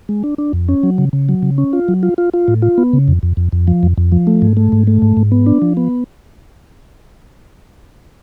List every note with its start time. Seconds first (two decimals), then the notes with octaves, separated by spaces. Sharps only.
0.09 G#3
0.24 D4
0.38 D4
0.53 F2
0.69 C#4
0.83 F#3
0.98 C#3
1.13 C#3
1.29 F#3
1.43 C#3
1.58 C#4
1.73 F4
1.88 F#3
2.03 F4
2.18 F4
2.33 F4
2.48 A2
2.62 F4
2.78 B3
2.93 C#3
3.08 F2
3.23 F2
3.37 F2
3.53 F2
3.67 F3
3.83 F2
3.98 F2
4.12 F3
4.27 A3
4.42 G#2
4.57 A3
4.72 G#2
4.87 A3
5.02 G#2
5.17 G#2
5.32 B3
5.46 D4
5.62 F3
5.77 B3